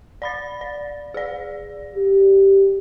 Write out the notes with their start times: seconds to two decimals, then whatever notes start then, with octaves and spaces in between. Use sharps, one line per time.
0.22 D5 B5 A6
0.61 D5
1.14 G#4 D5
1.96 G4